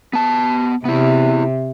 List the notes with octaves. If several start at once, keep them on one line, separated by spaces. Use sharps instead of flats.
B3 A5
C3 B3 E4